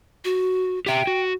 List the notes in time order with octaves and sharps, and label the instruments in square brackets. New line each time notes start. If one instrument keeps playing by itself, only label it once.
[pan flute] F#4
[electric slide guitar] G4 E5 [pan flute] G5
[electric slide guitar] F#4